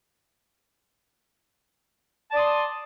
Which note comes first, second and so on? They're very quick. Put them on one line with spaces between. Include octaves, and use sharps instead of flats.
A5 D5 D#6 C6